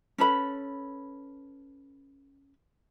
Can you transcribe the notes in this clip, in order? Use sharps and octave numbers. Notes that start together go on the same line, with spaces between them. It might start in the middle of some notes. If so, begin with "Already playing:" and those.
C#4 A4 B4 B5